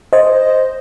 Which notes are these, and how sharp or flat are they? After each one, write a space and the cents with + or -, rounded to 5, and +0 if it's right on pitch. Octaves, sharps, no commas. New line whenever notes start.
C5 +0 D#5 +0